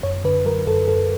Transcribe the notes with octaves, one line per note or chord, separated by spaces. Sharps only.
F#2 C#5
D3 B4
F#3 A#4
F#2 A4
F#2 A4